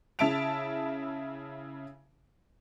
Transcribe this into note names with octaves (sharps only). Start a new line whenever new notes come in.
C#3 E4 E5 A5 D7 F7